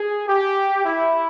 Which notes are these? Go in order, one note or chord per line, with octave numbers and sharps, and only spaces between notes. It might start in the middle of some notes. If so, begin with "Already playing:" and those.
Already playing: G#4
G4
E4